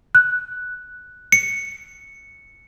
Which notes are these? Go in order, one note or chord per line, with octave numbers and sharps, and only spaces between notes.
F#6
C#7